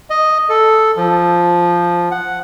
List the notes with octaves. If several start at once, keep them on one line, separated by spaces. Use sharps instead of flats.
D#5
A4
F3
F#5